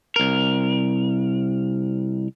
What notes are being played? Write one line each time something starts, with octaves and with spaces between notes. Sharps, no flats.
C2 A#4